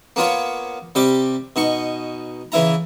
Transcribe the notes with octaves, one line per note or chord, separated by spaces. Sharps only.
A#3 B3 F4 C#5
C3 G3 G5 D6
B2 D#4 C#6
C#3 E3 E4 A#5